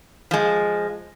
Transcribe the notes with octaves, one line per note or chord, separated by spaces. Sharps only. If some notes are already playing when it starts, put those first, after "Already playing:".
F3 G#3